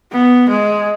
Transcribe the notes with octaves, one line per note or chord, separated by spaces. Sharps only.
B3
G#3